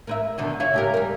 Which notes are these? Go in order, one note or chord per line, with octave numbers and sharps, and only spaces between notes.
A#4 B4 E5
B2 D3 D#3
E4 F4 C#5
C#3 G4 A#4
G3 A#4